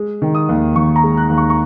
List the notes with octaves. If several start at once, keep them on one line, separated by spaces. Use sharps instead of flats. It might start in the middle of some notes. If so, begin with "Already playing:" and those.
Already playing: G#3
D#3
D#6
D#2
D#2 C#6
A#5
G#3
F#6
D#2
C#6
C#6